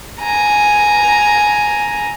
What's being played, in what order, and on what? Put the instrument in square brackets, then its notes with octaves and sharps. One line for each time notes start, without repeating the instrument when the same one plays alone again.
[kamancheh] G#5 A#5